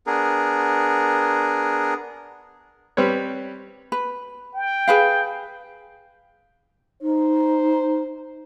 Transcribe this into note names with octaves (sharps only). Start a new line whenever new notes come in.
B3 D4 G#4 A#4
G3 C4 B4 C#5
B4
G5
G#4 B4 F5
D#4 C5